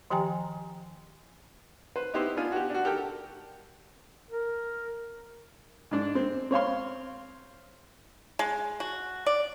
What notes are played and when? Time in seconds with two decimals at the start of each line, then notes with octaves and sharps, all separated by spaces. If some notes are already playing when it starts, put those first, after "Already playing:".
0.10 D#3 F3 G4 G5 G#5 A#5
1.96 B4 C5
2.14 B3 D#4 E4 G4 B4 C5
2.37 B3 D4 F4 G#5
2.52 F#4 G4
2.70 D4 F#4
2.85 G4 A4 A#4 G5
4.30 A#4
5.91 G#2 D4
6.15 C4
6.51 C4 C#5 F5 C6
8.39 G#3
8.80 F#4
9.26 D5